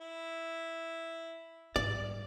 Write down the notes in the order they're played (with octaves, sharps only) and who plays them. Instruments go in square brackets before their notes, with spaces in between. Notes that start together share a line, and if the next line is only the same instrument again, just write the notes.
[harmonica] E4
[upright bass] G#2 G3 [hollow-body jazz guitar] D5